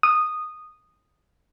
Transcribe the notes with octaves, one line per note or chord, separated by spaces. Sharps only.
D#6